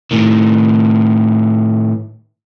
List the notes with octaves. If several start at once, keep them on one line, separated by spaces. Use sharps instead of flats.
A2 D#3